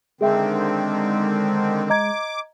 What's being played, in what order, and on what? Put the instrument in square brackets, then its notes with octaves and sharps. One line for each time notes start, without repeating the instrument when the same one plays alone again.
[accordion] D3 D#3 C4 [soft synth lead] G#3 [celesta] G#4 E5 G5
[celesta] D#5 A#5 G#6 [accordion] D6